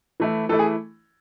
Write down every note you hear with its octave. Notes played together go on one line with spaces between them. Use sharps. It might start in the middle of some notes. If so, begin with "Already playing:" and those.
E3 A3 E4
E3 A3 E4 A4
G#4